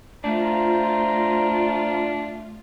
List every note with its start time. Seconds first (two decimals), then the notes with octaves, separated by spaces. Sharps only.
0.24 A3 D4 F4 C5 A#5